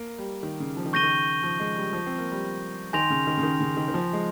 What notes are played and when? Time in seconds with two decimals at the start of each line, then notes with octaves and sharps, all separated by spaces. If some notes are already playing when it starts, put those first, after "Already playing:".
Already playing: A#3
0.18 G3
0.43 D#3
0.60 C#3
0.77 F3
0.86 D#3
0.93 C#3 C#6 G6 A#6 D#7 G7
1.03 D#3
1.43 F3
1.60 G#3
1.77 G3
1.93 F3
2.06 C4
2.18 A#3
2.31 G3
2.93 D#3 G#5 C6 G6 A#6 F7
3.10 C#3
3.27 D#3
3.37 C#3
3.43 D#3
3.60 C#3
3.77 D#3
3.88 D#3
3.94 F3
4.13 G#3